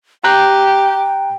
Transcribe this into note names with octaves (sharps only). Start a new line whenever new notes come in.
G4 G5 A#5 F#6 G6